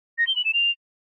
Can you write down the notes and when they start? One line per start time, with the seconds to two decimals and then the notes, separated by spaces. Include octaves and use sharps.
0.18 A#6
0.27 G7
0.36 F#7
0.45 E7
0.54 F7